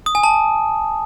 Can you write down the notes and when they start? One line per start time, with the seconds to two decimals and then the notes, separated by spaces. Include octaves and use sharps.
0.06 D#6
0.15 G#5
0.23 A5